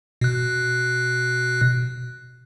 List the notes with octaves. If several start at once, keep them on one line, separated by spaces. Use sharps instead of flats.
B2 F#6